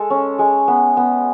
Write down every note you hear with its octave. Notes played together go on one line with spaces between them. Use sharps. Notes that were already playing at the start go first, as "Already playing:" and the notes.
Already playing: G#3 A4
C#4
G#3
B3
B3